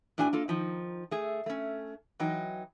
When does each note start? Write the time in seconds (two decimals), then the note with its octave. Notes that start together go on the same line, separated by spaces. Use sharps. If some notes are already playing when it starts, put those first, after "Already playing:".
0.18 A2 A3 D4 F#4 G#5
0.33 A#3 F4 A4
0.48 D#3 F3 D#4
1.11 A3 G#4
1.46 A3 C#4
2.20 E3 F#3 D#4 G5